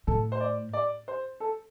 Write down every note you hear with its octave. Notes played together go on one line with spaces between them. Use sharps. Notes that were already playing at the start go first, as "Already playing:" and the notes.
A2 A4
C5
D5
D5
C5
A4